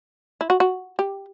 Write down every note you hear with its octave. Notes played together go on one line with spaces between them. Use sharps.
E4
F#4
F#4
G4